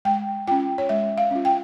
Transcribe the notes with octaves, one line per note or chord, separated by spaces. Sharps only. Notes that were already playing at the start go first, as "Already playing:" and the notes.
G#3 G5
C#4 F4 G5
C#5
G#3 E5
F5
C#4 F4
G5